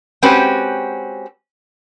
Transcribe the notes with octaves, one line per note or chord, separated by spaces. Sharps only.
G#3 C4 C#4 F#4 G4 B4